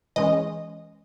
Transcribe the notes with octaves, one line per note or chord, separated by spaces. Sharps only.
E3 G#3 C#4 D#5